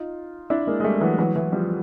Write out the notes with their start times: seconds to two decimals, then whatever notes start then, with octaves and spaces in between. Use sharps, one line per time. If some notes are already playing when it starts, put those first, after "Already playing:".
Already playing: D#4 F4
0.50 D4 E4
0.67 G#3 A#3
0.80 G#3
0.84 G3 A3
1.01 E3 F#3
1.18 E3 F#3
1.36 E3 F#3
1.52 F3 G3